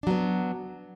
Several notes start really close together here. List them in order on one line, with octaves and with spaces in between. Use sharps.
D4 F#3 B3